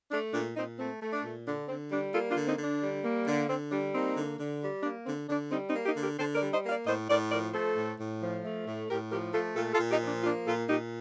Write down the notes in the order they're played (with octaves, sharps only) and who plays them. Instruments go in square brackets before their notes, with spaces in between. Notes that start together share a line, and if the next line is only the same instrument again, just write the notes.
[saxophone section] A3 D4
A#2 D4
A#2 C4 D#4
A3 C4
A3
D4
A#2
D3 D4
D3 C4
G3 D4
A#3 F4 A4
D4 F4
D3
C4 D#4
D3
D4
G3
A#3
D3
D3 C4
G3 D4
A#3 C4 D#4
D3
D3
G3
A#3 D4
D3 C4
D3 D4
G3 C4 D#4
C4 D#4
A#3
D#4 G4
D3
G4 A#4
D3 A4 C5
A#4 D5
G3
C5 D#5
A#3
D5 F5
A2 C5 D#5
A2 A#4 D5
F3 A#4 D5
A3 A4 C5
A2
A2
F3
A3
A2
A2 G4 A#4
F3 G4 A#4
A3 F4 A4
A#2 F4 A4
F4 A4
A#2
D#4 G4
F3
D4
A#3 D4 F4
A#2 F4 A4
A#2 D#4 G4